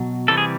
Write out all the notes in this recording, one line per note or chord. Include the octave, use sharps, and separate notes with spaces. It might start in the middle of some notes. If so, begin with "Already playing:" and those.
Already playing: B2 F#3
C3 E3 G3 A4
G#4